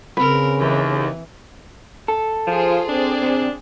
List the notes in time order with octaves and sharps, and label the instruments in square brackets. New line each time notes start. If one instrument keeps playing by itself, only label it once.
[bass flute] C#3 [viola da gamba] C4 A#4 [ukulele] B4
[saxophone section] D#2 [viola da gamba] E3
[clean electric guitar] A4
[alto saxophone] F3 [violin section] F4 G#4 C5
[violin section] C4 G#4 D5 [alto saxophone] D4
[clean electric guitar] C3